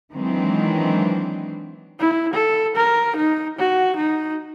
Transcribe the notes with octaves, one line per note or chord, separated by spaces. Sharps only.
D#3 E3 F#3 G#3 C4 D4
E4
A4
A#4
D#4
F#4
D#4